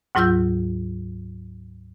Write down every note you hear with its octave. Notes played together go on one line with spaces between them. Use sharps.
D2 G#2 F#3 F4 E6 G6